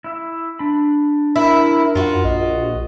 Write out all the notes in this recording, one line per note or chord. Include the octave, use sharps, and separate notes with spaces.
E4 E5
D4 B5
E4 A#4
F#2 F4 F#4
A#1 D#5